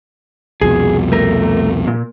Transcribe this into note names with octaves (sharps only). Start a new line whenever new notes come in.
C2 F2 B2 G#4
A3 A#4
A#2